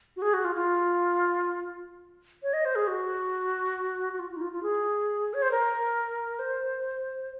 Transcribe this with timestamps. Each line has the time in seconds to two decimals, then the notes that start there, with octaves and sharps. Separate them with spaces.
0.16 F#4
0.22 G#4
0.34 F#4
0.45 F4
0.56 F4
2.43 C#5
2.53 D#5
2.65 C5
2.75 G#4
2.87 F#4
4.13 F#4
4.19 F4
4.31 F4
4.37 D#4
4.42 F4
4.53 F4
4.63 G#4
5.34 C#5
5.42 C5
5.51 A#4
6.39 C5